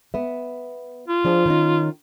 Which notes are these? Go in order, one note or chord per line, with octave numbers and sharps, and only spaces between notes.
B3 E5
F4
F3 D4 G#4
D#3 C#4 D#4